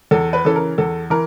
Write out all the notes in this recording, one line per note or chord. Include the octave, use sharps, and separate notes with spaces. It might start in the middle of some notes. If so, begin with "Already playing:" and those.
E2 A4
B4
C#3 E3 A4
A#4
E2 A4
E3 A#4